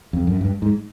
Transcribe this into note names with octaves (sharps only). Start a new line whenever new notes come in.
F2
F#2
G2
G#2